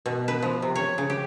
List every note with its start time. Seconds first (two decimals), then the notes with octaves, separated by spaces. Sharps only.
0.06 B2
0.28 B4
0.43 F3
0.62 C3
0.76 C#5
0.98 C#3
1.10 G4